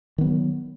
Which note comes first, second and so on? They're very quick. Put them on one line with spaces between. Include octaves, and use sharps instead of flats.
D#3 B3 F#3